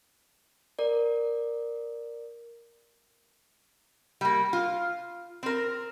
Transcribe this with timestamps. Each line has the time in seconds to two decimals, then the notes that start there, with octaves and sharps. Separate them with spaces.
0.79 A#4 D5
4.21 G3 A#3
4.53 F4
5.43 C4 A#4